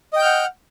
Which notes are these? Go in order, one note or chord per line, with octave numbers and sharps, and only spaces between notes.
D#5 F#5 G5 F6 G6